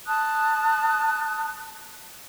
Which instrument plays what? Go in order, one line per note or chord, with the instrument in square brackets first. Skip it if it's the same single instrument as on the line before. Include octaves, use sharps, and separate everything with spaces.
[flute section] A5 D#6 F#6